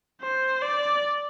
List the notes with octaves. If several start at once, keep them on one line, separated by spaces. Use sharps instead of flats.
C5
D5